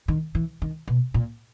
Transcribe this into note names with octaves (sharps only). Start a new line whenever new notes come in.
D#3
E3
D#3
B2
A#2